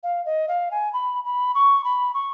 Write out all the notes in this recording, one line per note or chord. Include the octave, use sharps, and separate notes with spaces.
F5
D#5
F5
G#5
B5
B5
C#6
B5
C#6